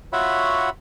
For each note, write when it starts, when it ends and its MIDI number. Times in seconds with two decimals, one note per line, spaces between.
0.13 0.70 65
0.13 0.70 66
0.13 0.70 73
0.13 0.70 76
0.13 0.70 78
0.13 0.70 83